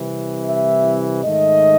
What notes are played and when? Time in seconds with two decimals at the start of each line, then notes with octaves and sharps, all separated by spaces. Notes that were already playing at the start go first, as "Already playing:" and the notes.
Already playing: C2 C3 E3
0.45 E5
1.24 G#2 D#3 A3 D#5